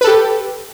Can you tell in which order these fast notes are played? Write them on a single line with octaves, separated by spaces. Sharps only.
B4 A4 G4